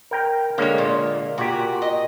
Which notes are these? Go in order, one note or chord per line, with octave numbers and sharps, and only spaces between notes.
A#4 G5 A#5
D3 G#3 A#3 C#4 C#5
A#2
A#2 F#4 G4
D#5